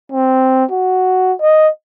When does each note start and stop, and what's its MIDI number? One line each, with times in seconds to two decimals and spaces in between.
0.12 0.65 60
0.71 1.34 66
1.41 1.69 75